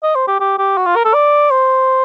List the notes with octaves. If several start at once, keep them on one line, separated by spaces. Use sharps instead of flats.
D#5
C5
G4
G4
G4
F#4
F4
A#4
A4
D5
C5